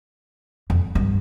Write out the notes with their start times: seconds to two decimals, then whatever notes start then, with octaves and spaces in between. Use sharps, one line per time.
0.70 F2
0.95 G2